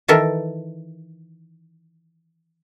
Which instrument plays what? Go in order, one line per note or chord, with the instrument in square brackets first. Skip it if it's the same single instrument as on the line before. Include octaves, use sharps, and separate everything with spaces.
[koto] D#3 E3 A4 A#4